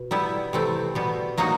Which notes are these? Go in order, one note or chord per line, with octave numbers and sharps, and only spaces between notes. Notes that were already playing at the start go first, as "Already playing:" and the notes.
Already playing: B2
G3 B3 E4
C3 E3 A3 C4
B2 G3 B3
F#3 A#3 D#4 F#4